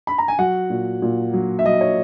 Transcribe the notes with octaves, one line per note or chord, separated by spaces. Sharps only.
B5
A#5
G#5
F#3 F#4 F#5
A#2
A#2
F#3
E5
F#3 D#5
C#5